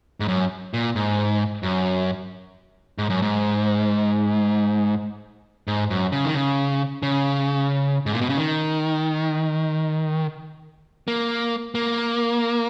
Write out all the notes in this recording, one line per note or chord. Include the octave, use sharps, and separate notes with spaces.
G#2
F#2
A#2
G#2
F#2
G#2
F#2
G#2
G#2
F#2
C#3
D#3
C#3
C#3
G#2
A#2
B2
C#3
D#3
A#3
A#3